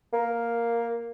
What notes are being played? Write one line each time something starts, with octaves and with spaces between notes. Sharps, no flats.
A#3